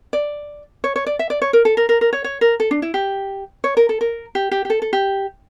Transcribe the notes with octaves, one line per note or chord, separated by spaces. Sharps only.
D5
C#5
C#5
D5
E5
D5
C#5
A#4
A4
A#4
A#4
A#4
C#5
C#5
A#4
A4
D4
E4
G4
C#5
A#4
A4
A#4
G4
G4
G4
A4
A4
G4